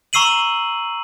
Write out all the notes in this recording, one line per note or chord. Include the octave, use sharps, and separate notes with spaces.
A#5 C#6 E6 C7 D#7 F#7